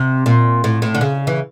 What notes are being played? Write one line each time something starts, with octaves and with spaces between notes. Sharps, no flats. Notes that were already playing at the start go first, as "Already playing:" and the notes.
Already playing: C3
A#2
A2
A2
D3
C#3
E3